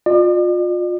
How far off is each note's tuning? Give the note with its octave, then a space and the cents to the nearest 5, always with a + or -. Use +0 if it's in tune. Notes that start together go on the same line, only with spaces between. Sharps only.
F4 +30 D5 +45